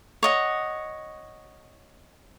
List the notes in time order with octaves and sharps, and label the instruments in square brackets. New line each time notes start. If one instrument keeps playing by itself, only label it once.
[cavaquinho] C#5 D#5 F#5